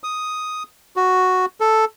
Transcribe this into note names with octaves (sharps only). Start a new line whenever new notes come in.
D#6
F#4
A4